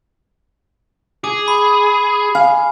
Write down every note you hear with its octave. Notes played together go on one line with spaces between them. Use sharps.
G#4 D6
B5
F5 G#5